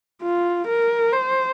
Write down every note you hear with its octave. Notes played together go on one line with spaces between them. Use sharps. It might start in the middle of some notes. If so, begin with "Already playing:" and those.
F4
A#4
C5